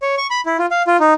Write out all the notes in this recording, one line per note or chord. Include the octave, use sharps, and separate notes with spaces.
C#5
C#6
B5
E4
F4
F5
F4
D#4